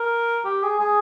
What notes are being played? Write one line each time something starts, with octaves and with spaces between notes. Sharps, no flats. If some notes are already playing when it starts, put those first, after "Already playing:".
Already playing: A#4
G4
G#4
G#4